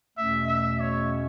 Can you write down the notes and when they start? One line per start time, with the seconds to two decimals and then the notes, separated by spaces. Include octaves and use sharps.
0.17 E2 B2 A3 C#4 E5
0.48 E5
0.80 C#5